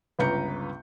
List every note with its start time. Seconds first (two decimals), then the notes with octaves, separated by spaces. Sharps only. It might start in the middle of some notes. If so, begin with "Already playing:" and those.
0.19 G1 C#2 B4 A#5 G6 C#7